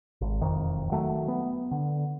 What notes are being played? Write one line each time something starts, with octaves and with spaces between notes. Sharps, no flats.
G#1
E1 F2 D#3
D#3 F#3 A3
B3
D3